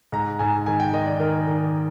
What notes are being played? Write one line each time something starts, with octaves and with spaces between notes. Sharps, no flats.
G#2 A#5
G#2 G#5
D#3 G#5
G5
D#3 D#5
D5
D#3 A#4
D#3